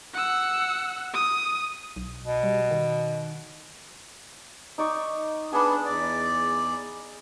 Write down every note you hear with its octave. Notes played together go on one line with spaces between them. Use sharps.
F#5 E6
D#6
B1
B2
G3
D#3
D#4 D5 C#6
B3 D4 G#4 B5
E2 D5